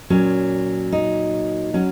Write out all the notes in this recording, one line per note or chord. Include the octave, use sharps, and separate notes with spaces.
A#2 F#3 C#4
D#4
F#3 C#4